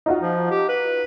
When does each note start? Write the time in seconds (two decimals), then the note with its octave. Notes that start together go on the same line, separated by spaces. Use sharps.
0.06 D#4 F4 F#4
0.22 F3
0.50 G4
0.68 B4